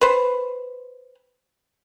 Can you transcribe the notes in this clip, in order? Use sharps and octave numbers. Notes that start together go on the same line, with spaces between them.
B4 C5